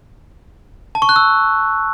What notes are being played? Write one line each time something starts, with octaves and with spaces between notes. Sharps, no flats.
A5
C#6
F#6
E6